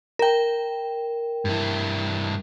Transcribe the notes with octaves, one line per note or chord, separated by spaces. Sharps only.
A#4 G5
G2 E4